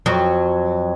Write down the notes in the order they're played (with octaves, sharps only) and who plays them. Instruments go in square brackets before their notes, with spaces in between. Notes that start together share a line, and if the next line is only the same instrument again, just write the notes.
[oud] F2 F#3